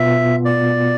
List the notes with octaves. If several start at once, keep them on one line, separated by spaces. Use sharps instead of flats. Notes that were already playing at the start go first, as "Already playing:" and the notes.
Already playing: B2 B3 F4 E5
D5